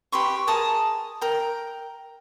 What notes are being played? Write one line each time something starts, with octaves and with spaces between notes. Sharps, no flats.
G4 B4 C6 C#6
G#4 A#4 A5 D#6
A#4 G5